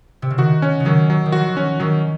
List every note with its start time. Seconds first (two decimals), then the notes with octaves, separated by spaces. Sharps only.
0.22 C3
0.30 C#3
0.38 D#3 F#4
0.62 C#4
0.80 C#3
0.85 D#3 F#3
1.10 F#3
1.26 D#3
1.32 F3 F#4
1.57 C#4
1.80 D#3 F#3